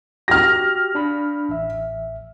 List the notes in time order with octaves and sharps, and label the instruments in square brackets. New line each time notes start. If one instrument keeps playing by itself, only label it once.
[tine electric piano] F#4 G4 [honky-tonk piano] F6 A#6
[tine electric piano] D4 B5
A1 E5